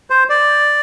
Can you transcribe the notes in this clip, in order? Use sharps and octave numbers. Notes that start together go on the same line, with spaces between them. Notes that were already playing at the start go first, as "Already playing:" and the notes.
C5
D5